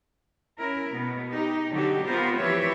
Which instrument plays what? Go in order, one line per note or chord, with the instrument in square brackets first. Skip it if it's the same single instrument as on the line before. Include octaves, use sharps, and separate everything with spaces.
[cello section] C#4 E4 A#4
B2 B3
D#4 G4
D3 F#3 C4 D#4 F#4 G4
B3 C4 F4 G4 A#4 C5
E3 F3 G4 B4 C#5 E5